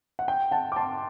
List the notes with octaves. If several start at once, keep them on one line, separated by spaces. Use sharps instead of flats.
F#5
G5
F#5 A5
D6
A5 C6